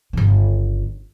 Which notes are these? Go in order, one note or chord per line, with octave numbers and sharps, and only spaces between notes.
G1 C#3